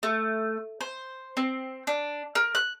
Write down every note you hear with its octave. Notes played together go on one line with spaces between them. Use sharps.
A3
C5
C4
D4
A#4
F#6